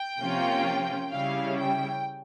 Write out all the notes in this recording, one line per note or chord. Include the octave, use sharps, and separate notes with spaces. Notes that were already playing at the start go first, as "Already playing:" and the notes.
Already playing: G5
C3 F3 A#3 C#4 F4
C#3 G3 C#4 E4 F5
G5